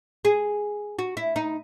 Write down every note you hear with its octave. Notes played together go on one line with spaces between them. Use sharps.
G#4
F#4
E4
D#4